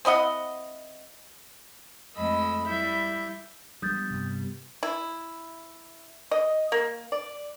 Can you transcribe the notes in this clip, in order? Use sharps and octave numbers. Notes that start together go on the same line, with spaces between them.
C4 E4 D#5 F#5
F2 G#3 A3 D#5 B5 E6
G3 E4 E5 G6
F3 G3 G#3 B3 D4 D#6 G6 A6
G2 C3
E4
D#5
A#3
D5